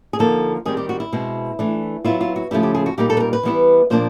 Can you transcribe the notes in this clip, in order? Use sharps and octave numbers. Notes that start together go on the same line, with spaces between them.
G#4
D3 F3 A#3 D#4 A4
D#3 G3 C4 G#4
G4
F#4
E4
B2 G#3 C4
E3 A3 D4
F#3 B3 E4 F4
F4
F#4
C#3 F3 A3 C#4 E4 G4
G4
G#4
F#4
A#2 G3 A#3 D#4 G4
A4
B4
A#4
B4
E3 G3 B3 E4
A#2 F3 A#3 D4 C5